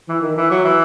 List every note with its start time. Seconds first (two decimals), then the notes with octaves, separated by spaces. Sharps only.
0.09 E3
0.22 D#3
0.37 E3
0.51 F#3
0.65 E3